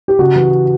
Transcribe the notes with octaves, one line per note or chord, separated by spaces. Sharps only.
G4
C#3 F#4
E3